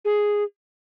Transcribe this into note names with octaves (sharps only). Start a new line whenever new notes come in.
G#4